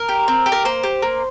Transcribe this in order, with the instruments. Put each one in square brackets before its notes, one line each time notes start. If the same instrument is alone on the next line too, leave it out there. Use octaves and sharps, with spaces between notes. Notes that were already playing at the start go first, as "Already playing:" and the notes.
Already playing: [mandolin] A#4
G4
C4
G4
A#4
A#3 C5
G4
A#3